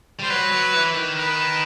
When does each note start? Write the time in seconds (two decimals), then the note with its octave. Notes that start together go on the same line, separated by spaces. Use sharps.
0.19 G3 C5
0.30 F#3 B4
0.52 F#3
0.74 E3
0.94 D#3
1.16 B4